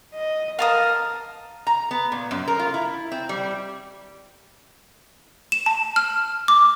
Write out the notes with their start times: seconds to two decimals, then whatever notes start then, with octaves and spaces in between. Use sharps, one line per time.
0.14 D#5
0.59 A#4 F5 A5 D#6
1.67 A#5
1.91 B3
2.12 A#2
2.31 F#2
2.48 A#4
2.59 F4
2.74 E4
3.12 C4
3.29 G3
5.52 E7
5.66 A5
5.96 F6
6.48 D6